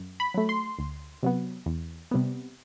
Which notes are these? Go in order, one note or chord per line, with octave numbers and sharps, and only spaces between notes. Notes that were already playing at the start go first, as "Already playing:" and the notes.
Already playing: F#2
B5
F#3 A3
C6
D2
C3 F#3 B3
E2
C3 G3 B3